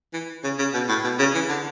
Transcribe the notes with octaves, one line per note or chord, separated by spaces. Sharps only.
E3
C#3
C#3
B2
A2
B2
C#3
E3
D3